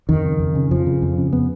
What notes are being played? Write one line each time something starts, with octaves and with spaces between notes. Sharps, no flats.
F2 D#3
C#3
F2
C#3
F2 F3
C#3
F2
C#3
B3